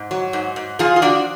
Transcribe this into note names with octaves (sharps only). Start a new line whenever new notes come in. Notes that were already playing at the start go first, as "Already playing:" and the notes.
Already playing: G#2
F#3
G#2
G#2
F3 F4 G#4
F4
F3 D4 F#4